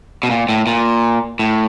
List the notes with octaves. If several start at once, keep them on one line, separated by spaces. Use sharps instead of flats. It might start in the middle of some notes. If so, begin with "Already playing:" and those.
B2
A#2
A2
A#2
A2